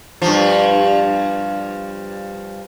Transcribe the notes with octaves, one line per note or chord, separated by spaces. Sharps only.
G2 F3